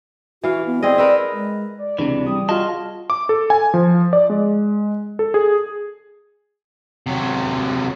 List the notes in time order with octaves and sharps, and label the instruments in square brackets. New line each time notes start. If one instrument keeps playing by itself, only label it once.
[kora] E3 F5 [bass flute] F#4
[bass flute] B3
[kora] C4 G#4 D#5 [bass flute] D5
[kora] A#4 B4 E5
[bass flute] G#3
[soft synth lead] D5
[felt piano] C#2 [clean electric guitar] C3 E3 [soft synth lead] D4
[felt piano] G3 [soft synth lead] D#6
[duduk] F4 [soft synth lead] F#4 [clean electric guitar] G#4 D#5 A5
[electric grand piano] D6
A4
G#5
F3
D5
G#3
A4
G#4
[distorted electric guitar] C3 F#3